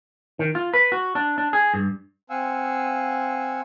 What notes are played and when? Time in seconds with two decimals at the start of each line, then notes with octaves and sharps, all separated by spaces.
0.39 D#3
0.55 F4
0.74 B4
0.92 F#4
1.15 D4
1.38 D4
1.53 G#4
1.74 G2
2.30 C4 F5 F#5 G#5 E6